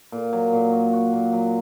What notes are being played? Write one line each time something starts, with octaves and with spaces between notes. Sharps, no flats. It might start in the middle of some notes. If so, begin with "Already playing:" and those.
A#2
F#3
A#2
F#4
F#4
A#2
F#3